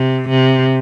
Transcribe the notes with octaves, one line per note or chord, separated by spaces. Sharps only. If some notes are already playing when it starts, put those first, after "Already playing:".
Already playing: C3
C3